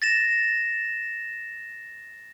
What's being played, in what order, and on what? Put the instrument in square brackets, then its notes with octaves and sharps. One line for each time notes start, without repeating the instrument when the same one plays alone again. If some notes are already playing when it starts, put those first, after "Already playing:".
[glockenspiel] A6 A#6 E7